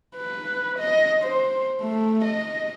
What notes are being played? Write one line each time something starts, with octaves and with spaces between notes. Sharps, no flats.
B4
D#5
C5
A3
D#5